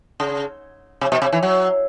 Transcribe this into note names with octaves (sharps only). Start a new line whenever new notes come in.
C#3
C3
B2
C3
E3
F#3